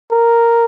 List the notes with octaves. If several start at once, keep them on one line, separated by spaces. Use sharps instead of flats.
A#4